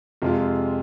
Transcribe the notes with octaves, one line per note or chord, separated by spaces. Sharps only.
F2 C3 G#3 F4